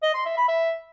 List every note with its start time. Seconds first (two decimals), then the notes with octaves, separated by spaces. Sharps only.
0.03 D#5
0.14 C6
0.26 E5
0.37 B5
0.48 E5